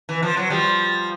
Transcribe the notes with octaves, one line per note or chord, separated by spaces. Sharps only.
E3
F3
F#3
F3 G3